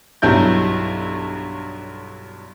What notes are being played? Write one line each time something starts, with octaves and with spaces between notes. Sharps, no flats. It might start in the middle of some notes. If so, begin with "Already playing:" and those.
B1 G2 F#3 E4 G6